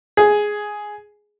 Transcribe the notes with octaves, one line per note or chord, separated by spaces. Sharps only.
G#4